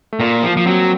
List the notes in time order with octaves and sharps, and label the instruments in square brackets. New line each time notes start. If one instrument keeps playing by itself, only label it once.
[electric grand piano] A3
[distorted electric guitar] A#2 [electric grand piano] A#3
[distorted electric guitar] F3
F3
[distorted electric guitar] F#3 [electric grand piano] C4